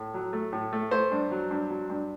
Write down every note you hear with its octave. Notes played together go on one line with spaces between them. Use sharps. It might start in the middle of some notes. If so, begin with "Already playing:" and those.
Already playing: A2
F#3
A3
A2
A3
A3 C5
G2
F#3
G2
F#3
G2